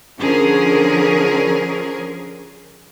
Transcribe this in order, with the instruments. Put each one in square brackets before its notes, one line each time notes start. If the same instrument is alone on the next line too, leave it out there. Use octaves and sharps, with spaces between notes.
[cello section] D3 F3 C#4 G#4 A#4